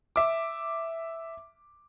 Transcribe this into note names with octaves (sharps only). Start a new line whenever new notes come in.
E5 D6